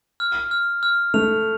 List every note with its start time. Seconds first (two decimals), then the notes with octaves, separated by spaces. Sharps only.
0.20 F6
0.51 F6
0.83 F6
1.14 A3 F7